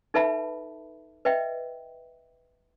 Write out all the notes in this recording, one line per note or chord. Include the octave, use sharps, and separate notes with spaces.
D#4 A4 B4 E5 A5 B5
B4 D#5 E5 G5